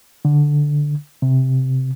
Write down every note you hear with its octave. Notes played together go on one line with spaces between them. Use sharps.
D3
C3